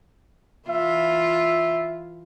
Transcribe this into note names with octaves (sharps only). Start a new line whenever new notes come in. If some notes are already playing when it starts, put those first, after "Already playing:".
E3 F4 E5